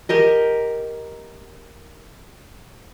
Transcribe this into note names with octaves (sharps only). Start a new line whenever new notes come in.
G4 A#4 D#5